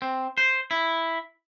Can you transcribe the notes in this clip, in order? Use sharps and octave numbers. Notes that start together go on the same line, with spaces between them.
C4
C5
E4